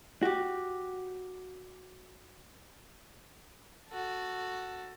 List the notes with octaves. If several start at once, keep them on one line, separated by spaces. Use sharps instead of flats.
F#4 G4
F#4 A4